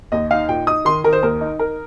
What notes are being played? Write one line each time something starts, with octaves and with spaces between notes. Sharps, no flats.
D#2 D#5
D#4 F5
A#2 G5
D#4 D#6
D#3 C6
D#3 A#4
C5
D#2 A#4
D#4
D#4 A#4